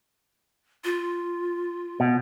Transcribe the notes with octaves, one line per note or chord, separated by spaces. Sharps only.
F4
B2